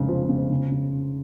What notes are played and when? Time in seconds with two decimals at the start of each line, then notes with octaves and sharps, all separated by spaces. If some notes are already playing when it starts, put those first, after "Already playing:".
Already playing: F1 G#2 C#3
0.08 F3
0.29 C#3
0.50 C#3
0.71 C#3